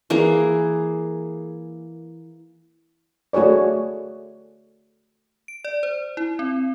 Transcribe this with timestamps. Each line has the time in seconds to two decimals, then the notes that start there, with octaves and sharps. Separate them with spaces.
0.10 E3 A#3 G#4
3.33 A3 F#4 G#4 C#5 D5
5.48 D7
5.65 D5
5.83 C5
6.17 E4
6.39 C4